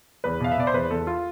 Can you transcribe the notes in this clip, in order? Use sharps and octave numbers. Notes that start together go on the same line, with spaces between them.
E2 B4
B2 F5
E5
B2 D5
C5
E2 B4
E2 A4
F4